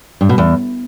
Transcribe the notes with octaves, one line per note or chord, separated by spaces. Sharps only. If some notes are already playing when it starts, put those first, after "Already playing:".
G2
B2
E2